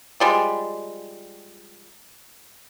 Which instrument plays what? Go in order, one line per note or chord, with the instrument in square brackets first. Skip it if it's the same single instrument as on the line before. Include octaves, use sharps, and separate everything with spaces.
[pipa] F3 G3 G#3